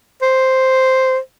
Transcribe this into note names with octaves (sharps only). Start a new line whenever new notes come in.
C5